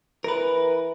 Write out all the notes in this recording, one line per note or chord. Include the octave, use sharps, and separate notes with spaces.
E3 A#4 B4